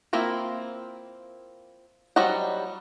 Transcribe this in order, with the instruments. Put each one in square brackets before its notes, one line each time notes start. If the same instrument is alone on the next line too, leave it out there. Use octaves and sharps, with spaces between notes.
[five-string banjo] A#3 C4 E4 F4 A#4
F#3 G3 C5 D#5 F#5